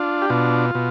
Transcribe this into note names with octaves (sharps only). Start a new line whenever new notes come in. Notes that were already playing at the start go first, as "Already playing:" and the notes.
Already playing: D4 F4
G4
B2 F4
B2